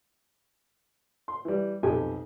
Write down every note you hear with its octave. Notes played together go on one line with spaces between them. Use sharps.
C6
E3 G3
B1 F2 G4 A4 G#5